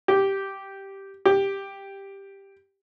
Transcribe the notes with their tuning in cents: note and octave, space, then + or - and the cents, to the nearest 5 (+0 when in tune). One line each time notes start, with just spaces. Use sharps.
G4 -5
G4 +5